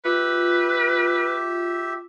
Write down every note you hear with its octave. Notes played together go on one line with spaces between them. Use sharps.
F4 G4 B4 E5